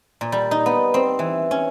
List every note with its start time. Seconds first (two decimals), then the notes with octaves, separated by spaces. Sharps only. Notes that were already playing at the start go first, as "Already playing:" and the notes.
0.21 A#2
0.32 G3
0.51 D#4
0.66 B3
0.94 C4
1.19 E3
1.51 C#4